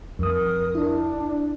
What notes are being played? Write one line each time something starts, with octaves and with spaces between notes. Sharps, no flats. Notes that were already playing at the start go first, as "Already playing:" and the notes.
F2 A#4 D#6
D4 E4